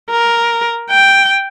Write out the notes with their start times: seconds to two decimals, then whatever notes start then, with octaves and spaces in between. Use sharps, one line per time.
0.10 A#4
0.90 G5